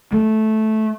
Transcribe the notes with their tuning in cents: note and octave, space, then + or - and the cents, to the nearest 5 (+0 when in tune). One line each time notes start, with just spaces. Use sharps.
A3 -10